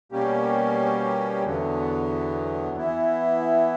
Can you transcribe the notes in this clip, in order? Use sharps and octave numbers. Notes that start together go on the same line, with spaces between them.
B2 G3 A#3 C#4 G4
E2 D3 F#3 B3
E3 B3 E4